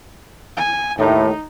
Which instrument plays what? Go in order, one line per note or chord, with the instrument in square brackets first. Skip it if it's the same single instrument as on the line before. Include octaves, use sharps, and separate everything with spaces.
[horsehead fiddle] G#5
[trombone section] D#2 A2 [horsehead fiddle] D#4